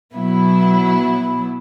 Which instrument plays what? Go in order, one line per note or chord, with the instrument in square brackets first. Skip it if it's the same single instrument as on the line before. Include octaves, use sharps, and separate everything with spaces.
[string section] B2 F#3 B3 E4